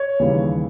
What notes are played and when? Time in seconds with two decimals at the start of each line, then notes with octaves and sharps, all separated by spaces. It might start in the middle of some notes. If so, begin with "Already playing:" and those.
Already playing: C#5
0.20 D#2 C#3 E3 G3